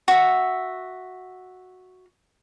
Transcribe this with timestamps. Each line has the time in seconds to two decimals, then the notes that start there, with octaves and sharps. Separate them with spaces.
0.08 F#4 E5